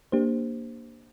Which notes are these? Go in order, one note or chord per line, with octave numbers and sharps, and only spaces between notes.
A#3 D4 G4 C5